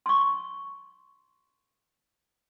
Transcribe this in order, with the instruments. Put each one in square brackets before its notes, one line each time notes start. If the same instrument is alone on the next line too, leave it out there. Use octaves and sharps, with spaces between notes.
[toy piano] C6 C#6